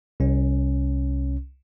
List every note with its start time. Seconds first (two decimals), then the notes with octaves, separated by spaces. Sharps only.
0.20 C2 C#4